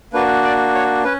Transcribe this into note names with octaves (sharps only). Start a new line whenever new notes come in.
A#3 D4 F#4 B4
D5
C#5
C#4 B4